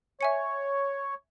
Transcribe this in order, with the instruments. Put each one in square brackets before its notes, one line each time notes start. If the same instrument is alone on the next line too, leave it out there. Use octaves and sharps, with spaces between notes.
[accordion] C#5 [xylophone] E5 G#5 C#7